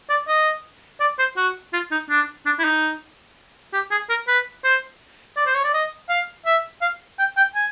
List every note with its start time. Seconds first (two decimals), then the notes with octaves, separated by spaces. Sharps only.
0.09 D5
0.28 D#5
1.00 D5
1.19 C5
1.37 F#4
1.73 F4
1.91 D#4
2.10 D4
2.46 D4
2.59 E4
2.64 D#4
3.73 G4
3.91 G#4
4.10 A#4
4.28 B4
4.64 C5
5.37 D5
5.46 C5
5.55 C#5
5.64 D5
5.73 D#5
6.09 F5
6.46 E5
6.82 F5
7.19 G5
7.37 G5
7.55 G#5